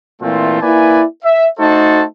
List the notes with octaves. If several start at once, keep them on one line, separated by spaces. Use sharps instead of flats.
A#2 E3 A3 C4 F4 A5
A#3 E4 B4 D5 G#5
E5
A3 D#4 F#4 A4 C5 A5